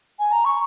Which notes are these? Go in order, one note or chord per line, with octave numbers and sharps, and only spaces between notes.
G#5
A#5
C#6